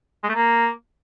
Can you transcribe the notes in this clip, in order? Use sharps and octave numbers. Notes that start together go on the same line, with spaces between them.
G#3
A3
A#3